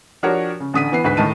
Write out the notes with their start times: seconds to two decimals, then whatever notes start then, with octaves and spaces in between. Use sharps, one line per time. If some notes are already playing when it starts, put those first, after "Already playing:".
0.23 F3 D4 F#4 G4 A#4 C#5
0.60 C#3
0.74 A1 D3 D#6 B6 D#7
0.92 E3 B3 C7
1.04 D2 G#2 B4 B6
1.17 A2 D#3 D#4 A5 D#7